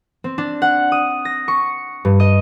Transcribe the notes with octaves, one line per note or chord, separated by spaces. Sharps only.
C4
D4
F#5
D#6
A#6
C#6
G2
D#5